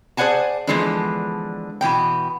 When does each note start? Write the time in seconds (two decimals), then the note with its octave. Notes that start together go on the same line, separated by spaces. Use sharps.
0.17 G#4 C5 D5 F#5 G#5 A5
0.67 D3 E3 F3 G#3 B3 D4
1.81 B2 E3 B3 G5